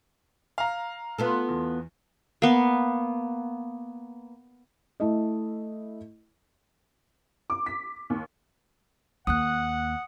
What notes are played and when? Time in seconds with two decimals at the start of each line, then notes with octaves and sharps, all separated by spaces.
0.58 F5 A#5
1.18 B3 F4 A4
1.48 E2
2.42 A#3 B3
5.00 A3 E4 D#5
7.50 D6
7.66 B6
8.10 D#2
9.27 D#2 A#3 F#5 D#6 F#6